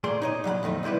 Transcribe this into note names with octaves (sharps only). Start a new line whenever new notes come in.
A#2 A3 G#4 D5 C6
D#4 C#5 D#5
A#2 F#3 F5 B5
F2 D#3 A3 D#4
D2 C3 G3 E4 B4